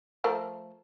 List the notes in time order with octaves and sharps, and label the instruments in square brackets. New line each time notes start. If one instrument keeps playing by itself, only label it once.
[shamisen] F3 A3 A#4